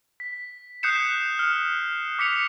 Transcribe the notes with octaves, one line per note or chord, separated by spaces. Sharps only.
B6
D#6 F#6 G6 C7 C#7 E7
F6
D6 B6 C#7 F7